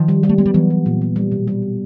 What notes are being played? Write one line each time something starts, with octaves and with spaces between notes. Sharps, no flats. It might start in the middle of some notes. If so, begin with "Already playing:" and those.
Already playing: D#3 F3
G3
G3
A3
G#3 B3
G3
E3 F#3 B3
G3
A#2
B3
G3
B2
G3
B3